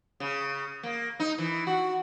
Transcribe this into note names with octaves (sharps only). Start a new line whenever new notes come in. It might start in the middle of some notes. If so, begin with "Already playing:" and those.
C#3
A#3
D#4
E3
F#4